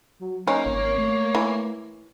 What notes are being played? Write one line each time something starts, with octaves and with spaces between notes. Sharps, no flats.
F#3
A#3 C#4 D#4
G#1 C4 C#5
A3
E3